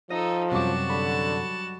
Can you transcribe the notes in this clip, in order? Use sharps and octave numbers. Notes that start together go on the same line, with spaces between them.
F3 D#4 A4 D#5
F#2 C3 F#3 G3 F#4 A5 D6
D3 B5